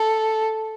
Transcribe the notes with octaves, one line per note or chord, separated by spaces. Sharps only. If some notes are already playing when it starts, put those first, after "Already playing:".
Already playing: A4